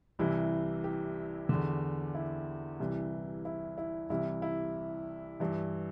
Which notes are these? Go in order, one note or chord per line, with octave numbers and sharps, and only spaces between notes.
C2 C3 E3 E4
G4
E2 D3
E4
C2 C3 E3
E4
E4
C2 C3 E3 E4
E4
G2 E3